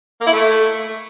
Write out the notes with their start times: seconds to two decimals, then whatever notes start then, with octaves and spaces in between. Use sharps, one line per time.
0.21 A#3
0.27 E4
0.32 A3